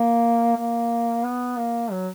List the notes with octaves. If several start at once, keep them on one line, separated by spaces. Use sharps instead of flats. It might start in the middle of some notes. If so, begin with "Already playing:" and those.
Already playing: A#3
A#3
B3
A#3
F#3